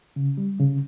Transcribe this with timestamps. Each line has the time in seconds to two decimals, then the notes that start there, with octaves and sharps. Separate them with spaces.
0.16 C#3
0.37 G3
0.59 C#3